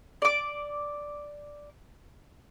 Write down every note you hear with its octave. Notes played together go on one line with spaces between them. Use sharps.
D5 D6